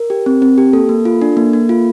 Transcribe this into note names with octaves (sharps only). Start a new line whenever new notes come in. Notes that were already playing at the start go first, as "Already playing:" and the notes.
Already playing: A#4
G4
C4
C4
G4
A#3 A4
A#3
F4
D4
A#3
A#3
F4